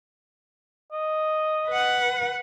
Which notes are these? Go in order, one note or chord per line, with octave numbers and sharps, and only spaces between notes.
D#5
B4 F#5